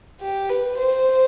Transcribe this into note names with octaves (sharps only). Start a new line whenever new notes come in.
G4
B4
C5